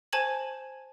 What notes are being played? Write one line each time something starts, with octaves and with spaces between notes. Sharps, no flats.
C5 G#5 A5 G#6 F#7